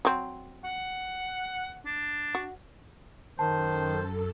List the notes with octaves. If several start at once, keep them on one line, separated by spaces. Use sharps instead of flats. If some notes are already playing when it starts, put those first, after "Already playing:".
F#3 C4
F#5
D4
F#4
F#2 D#3 A4 C5 A5